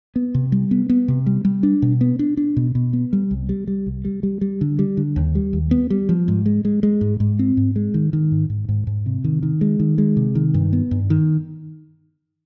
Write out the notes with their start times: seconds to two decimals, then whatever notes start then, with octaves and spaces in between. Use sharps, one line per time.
0.16 B3
0.35 C3
0.52 G3
0.71 B3
0.89 B3
1.08 C3
1.26 G3
1.45 G3
1.63 D4
1.82 B2
2.01 B3
2.19 D4
2.37 D4
2.57 B2
2.75 B2
2.93 B3
3.13 G3
3.31 C2
3.49 G3
3.67 G3
3.86 C2
4.05 G3
4.23 G3
4.41 G3
4.61 D3
4.79 G3
4.97 D3
5.16 D#2
5.35 G3
5.53 D#2
5.71 B3
5.90 G3
6.09 F3
6.28 G#2
6.46 G#3
6.65 G#3
6.83 G#3
7.01 G#2
7.20 G#2
7.39 C4
7.57 G#2
7.76 G#3
7.94 D#3
8.13 D#3
8.32 G#2
8.50 G#2
8.69 G#2
8.87 G#2
9.06 C3
9.24 D#3
9.43 D#3
9.61 G#3
9.80 D#3
9.98 G#3
10.17 C3
10.35 D#3
10.54 G2
10.73 B3
10.91 G2
11.10 D#3